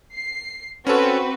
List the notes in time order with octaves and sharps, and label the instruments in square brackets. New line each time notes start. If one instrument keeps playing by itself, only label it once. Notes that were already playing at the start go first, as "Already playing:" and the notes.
[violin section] C7
[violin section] C4 F#4 B4 [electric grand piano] C#4 A4